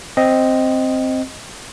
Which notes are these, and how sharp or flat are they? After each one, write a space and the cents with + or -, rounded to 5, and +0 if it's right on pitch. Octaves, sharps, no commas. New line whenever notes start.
C4 +0 D#5 +0